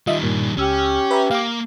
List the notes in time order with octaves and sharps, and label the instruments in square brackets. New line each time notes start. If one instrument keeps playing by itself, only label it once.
[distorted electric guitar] D#3 G3 [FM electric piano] F4 D#5 E5
[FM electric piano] G2 A#2
[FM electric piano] C#2 E6 F6 [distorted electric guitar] C#4 [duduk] G4
[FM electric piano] B4 E5 A#5
[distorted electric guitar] A#3 [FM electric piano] F5 D6